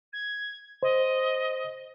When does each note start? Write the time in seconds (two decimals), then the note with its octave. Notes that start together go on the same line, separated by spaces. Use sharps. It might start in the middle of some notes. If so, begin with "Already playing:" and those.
0.13 G#6
0.83 C5 D#5